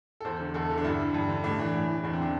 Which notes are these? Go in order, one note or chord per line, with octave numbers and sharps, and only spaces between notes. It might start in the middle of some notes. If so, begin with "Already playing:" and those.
A4
E2 C5
D3
E2 A4
D3
D4
G2 E4
D3
G2
D3
A2 D4
E3
A2
E3
E2 D4
C4
D3 D4